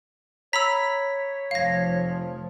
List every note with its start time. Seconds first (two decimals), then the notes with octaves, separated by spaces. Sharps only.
0.53 C#5 A#5 B5 E6 B6
1.51 F1 F3 F5 A#6